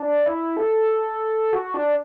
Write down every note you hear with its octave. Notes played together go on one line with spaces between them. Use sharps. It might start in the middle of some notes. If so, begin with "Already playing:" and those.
Already playing: D4
E4
A4
F#4
D4